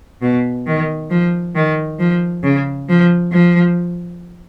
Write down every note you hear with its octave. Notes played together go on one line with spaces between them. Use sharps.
B2
D#3
F3
D#3
F3
C#3
F3
F3